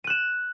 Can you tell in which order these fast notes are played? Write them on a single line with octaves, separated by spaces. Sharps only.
D#7 F#6 E7